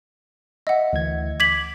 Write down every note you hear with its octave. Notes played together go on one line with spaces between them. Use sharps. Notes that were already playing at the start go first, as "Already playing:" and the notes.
D#5 E5 F#5
D2 E3 G#6
D6 G#6 B6 F#7